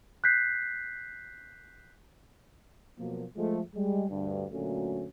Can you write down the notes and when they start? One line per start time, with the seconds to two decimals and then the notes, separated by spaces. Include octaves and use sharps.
0.24 F#6 G6 B6 C7
2.99 B2 F3 F#3 A#3
3.37 F3 G#3 A3
3.76 G3 G#3
4.10 D2 G2
4.52 D2 A#2 F#3 A3 C#4 F#4